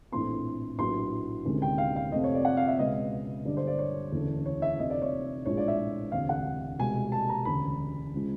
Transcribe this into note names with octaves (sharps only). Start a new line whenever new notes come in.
A#1 A2 E3 A3 C4 C6
A#1 A2 F#3 B3 C6
D2 C3 D#3 G#3 C#4
G5
F5
F5
F2 C3 F3 A3 C4 D#5
C#5
D5
F#5
F5
E5
C#2 B2 G#3 B3 D#5
G1 G2 D3 D5
C5
D5
C#5
E1 D2 C#3 E3 A3
C#5
E5
F1 F2 D3 D#5
D5
C#5
A#1 A2 F3 G#3 C#5
D5
E5
E1 D2 C3 F5
F#5
C2 B2 G#3 G#5
A5
A#5
E1 D2 C#3 B5
C#3 F3 G#3